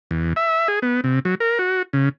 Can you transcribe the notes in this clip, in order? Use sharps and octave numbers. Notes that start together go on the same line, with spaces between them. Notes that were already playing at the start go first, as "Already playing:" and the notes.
E2
E5
G#4
B3
C3
F#3
A#4
F#4
C#3